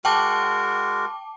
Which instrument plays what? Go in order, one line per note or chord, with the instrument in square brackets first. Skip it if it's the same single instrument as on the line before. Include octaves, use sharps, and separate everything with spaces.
[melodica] G#3 F#4 A#4 [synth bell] G5 A5 D6